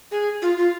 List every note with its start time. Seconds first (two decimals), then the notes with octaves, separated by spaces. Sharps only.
0.11 G#4
0.42 F4
0.57 F4